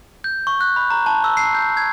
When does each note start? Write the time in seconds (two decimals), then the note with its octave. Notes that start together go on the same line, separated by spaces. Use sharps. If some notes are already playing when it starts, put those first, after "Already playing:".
0.24 G6
0.47 C#6
0.61 F#6
0.76 B5
0.90 A#5
1.06 A5
1.24 E6
1.37 C7
1.54 G6
1.77 G#6